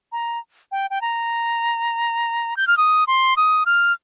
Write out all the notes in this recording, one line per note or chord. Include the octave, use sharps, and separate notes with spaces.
A#5
G5
G5
A#5
G6
F6
D#6
C6
D#6
F6